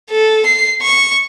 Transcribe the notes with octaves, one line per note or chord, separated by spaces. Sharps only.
A4
C7
C#6